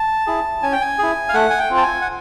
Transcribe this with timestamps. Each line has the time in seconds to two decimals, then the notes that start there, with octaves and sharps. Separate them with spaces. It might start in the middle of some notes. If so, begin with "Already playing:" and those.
Already playing: A5
0.27 E4 G#4
0.63 C#4 G#5
0.73 G5
0.81 G#5
0.99 E4 G#4
1.29 F5
1.34 A3 F#5
1.50 G#5
1.59 G5
1.70 C4 F4
1.77 A5
1.83 G#5
2.02 F#5